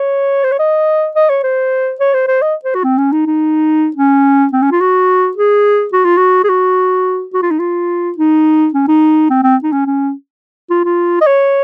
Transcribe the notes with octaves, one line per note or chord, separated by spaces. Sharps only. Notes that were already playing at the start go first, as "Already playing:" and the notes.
Already playing: C#5
C5
C#5
D#5
D#5
C#5
C5
C#5
C5
C5
D#5
C5
F#4
C4
C#4
D#4
D#4
C#4
C4
C#4
F4
F#4
G#4
F#4
F4
F#4
G#4
F#4
F#4
F4
D#4
F4
D#4
C#4
D#4
C4
C4
D#4
C#4
C#4
F4
F4
D#5
C#5